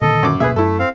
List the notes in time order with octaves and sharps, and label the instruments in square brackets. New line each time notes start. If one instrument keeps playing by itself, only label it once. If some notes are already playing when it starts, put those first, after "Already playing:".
[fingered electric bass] A#2 D3 D#3 [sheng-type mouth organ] A4 D#5
[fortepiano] F#2 D6
[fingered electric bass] D1 B2 A#3 [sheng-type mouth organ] G#4 [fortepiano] B4 E5
[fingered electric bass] F#2 [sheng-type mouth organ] A3 [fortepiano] E4 A4
[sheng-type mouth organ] C4 F5